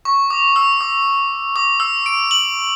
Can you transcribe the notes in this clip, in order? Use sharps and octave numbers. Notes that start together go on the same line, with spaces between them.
C#6
D6
E6
D6
D6
E6
D7
F#7